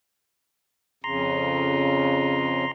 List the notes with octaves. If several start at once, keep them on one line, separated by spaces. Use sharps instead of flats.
F2 C#3 A#5 C6